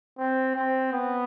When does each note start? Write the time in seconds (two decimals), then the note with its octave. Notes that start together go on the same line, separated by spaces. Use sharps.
0.18 C4
0.56 C4
0.93 B3